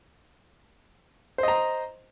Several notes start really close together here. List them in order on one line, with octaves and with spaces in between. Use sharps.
C5 D#5 A#5